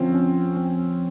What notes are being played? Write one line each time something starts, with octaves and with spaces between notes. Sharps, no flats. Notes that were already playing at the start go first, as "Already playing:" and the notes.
Already playing: F2 D3 F3 C4 C#4
C#4
C4